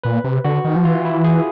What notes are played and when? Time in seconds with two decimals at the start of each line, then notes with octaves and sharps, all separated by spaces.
0.04 A#2 B4
0.24 C3
0.44 D3 F#4
0.64 D#3
0.76 F3
0.85 E3 F4
1.05 E4
1.24 G#4